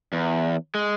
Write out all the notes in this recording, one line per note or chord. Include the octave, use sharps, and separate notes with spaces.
E2
G#3